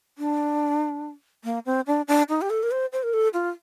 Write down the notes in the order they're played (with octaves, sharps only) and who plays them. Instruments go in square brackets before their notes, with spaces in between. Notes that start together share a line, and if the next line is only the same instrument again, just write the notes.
[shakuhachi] D4
A#3
C4
D4
D4
D#4
G4
A4
A#4
C5
C5
A#4
A4
F4